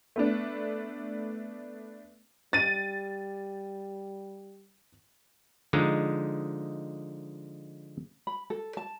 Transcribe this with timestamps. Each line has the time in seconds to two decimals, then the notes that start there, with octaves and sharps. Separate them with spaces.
0.16 A3 B3 D4
2.53 G3 A6 D#7
5.73 D3 F3 G#3 D#4
8.27 B5
8.50 A4
8.77 A5